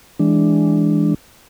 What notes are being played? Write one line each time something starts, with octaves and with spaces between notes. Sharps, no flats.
E3 G#3 D4